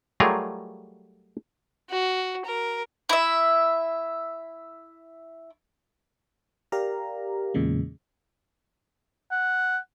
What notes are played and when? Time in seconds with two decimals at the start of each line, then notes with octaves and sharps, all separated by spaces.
0.20 F#3 G3 A3 F4 G#4 A#4
1.90 F#4
2.45 A#4
3.09 E4 E5
6.72 G4 A#4 D5 F5 A#5
7.54 E2 A#2 C#3 G#3
9.31 F#5